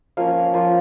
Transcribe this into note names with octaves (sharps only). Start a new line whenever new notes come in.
F3 A#3 C#4 F5
F3 A#3 F4